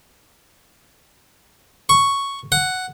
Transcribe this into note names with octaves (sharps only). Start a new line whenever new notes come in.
C#6
F#5